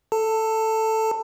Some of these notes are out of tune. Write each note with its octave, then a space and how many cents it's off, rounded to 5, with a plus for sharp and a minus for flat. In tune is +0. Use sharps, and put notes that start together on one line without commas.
A4 +0 A5 +20